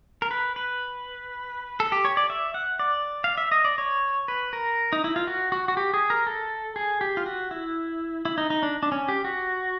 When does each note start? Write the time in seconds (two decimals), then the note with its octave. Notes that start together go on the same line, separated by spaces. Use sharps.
0.22 A#4
0.31 B4
0.56 B4
1.80 A4
1.92 G4
2.05 C#5
2.17 D5
2.30 E5
2.54 F#5
2.79 D5
3.24 F5
3.38 E5
3.52 D#5
3.65 D5
3.78 C#5
4.28 B4
4.53 A#4
4.93 D#4
5.04 E4
5.16 F4
5.27 F#4
5.52 F#4
5.68 F#4
5.77 G4
5.94 G#4
6.10 A#4
6.27 A4
6.76 G#4
7.01 G4
7.17 F4
7.26 F#4
7.51 E4
8.25 E4
8.38 D#4
8.50 D#4
8.63 D4
8.83 D4
8.92 C#4
9.09 G4
9.25 F#4